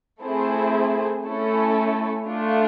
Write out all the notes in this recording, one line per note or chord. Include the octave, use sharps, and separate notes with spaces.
A3 C4 E4 G#4 C5
A3 C#4 E4 A4
A3 D4 F4